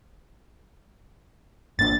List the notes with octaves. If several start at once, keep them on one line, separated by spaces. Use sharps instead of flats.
G#1 A#3 D4 A6